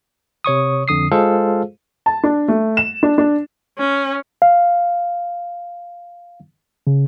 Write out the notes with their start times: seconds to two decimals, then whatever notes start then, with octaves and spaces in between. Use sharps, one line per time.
0.44 C3 C#5 C#6 D#6
0.88 F2 D3 D#6 C7
1.12 G#3 F4 G#4 A4 C5 F5
2.06 A5
2.23 D4
2.48 A3
2.77 E7
3.03 D4
3.18 D4
3.78 C#4
4.42 F5
6.87 C#3